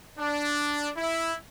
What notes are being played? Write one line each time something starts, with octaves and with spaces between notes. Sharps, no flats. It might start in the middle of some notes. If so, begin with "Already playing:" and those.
D4
E4